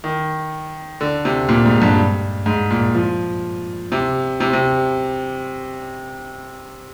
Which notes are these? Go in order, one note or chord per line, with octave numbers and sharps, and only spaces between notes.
D#3
D3
C3
A#2
G#2
G2
G#2
A#2
F3
C3
C3
C3